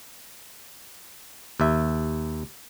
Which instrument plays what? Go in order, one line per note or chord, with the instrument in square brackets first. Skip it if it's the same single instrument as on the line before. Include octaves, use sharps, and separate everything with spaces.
[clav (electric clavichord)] D#2 E5